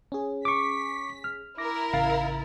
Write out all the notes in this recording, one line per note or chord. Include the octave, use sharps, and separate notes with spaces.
C#4 G#4
C#6 D6 B6
F6
E4 A#4 D6 A#6
A1 C#3 F5 A6